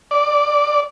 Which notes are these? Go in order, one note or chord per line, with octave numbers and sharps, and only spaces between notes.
D5